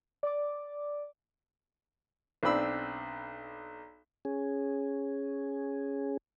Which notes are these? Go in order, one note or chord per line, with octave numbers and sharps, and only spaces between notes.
D5 D6
B1 C4 D4 B5 E6
C#4 G#4